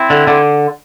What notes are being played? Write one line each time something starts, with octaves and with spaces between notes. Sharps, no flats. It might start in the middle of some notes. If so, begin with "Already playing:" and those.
Already playing: C4 E4
D3
D3